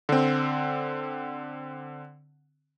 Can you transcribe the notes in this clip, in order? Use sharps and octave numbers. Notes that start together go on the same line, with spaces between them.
D3 C4